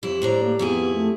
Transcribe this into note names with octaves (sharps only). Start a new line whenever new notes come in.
F2 E4 G4
A2 D4 C5 A#5
A#3
F2 B3 E4 G#4
A3